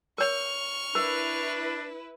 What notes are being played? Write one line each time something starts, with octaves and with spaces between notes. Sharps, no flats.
A#4 C#5 C#6 F6
D4 E4 A#4 B4